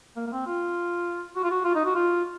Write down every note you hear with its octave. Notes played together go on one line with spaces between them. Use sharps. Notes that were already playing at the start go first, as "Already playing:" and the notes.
A#3
A#3
C4
F4
F#4
F4
F#4
F4
D#4
F#4
F4